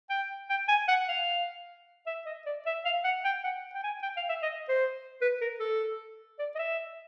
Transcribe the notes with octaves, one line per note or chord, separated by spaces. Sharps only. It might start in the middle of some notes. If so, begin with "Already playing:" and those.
G5
G5
G#5
F#5
F5
E5
D#5
D5
E5
F5
F#5
G5
F#5
G5
G#5
G5
F5
E5
D#5
C5
B4
A#4
A4
D5
D#5
E5